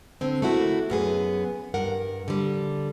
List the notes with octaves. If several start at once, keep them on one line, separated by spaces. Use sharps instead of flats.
D3 C4
A3 A#3 E4 F#4
F#2 B3 G#4
G2 A#4 F#5
D3 G3